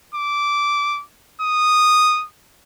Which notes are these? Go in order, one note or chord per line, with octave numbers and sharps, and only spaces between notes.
D6
D#6